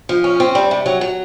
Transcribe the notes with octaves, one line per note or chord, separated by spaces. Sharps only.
F3
C#4
C4
G3
C3
F#3
F#3